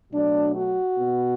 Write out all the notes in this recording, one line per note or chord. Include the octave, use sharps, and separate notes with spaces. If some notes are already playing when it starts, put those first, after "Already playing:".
B2 F#3 A3 D4
F#4
B2 B3